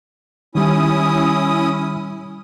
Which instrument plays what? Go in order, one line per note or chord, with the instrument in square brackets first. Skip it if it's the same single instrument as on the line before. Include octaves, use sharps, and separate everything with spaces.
[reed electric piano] D#3 G3 [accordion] C#4 E4 D#6